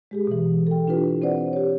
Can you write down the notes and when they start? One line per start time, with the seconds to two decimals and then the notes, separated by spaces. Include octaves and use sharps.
0.11 G#3 G4 G#4
0.27 B2 E3
0.67 A4 G5
0.88 D4 E4 F4 G4 B4
1.22 C4 B4 C5 D5 F#5
1.53 G4 C#5